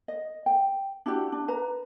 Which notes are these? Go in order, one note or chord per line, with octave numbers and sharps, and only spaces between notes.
D#5
G5
D4 E4 F#4 G4
D4
B4 A#5